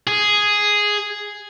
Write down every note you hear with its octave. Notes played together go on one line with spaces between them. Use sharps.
G#4